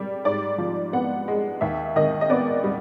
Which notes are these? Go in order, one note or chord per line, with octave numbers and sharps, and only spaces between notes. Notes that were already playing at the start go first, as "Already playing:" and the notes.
Already playing: G3 D5
G#2 D5
F3
B3 F#5
G#3
D#2 E5
D#3 D#5
D#5
B3 D5
G3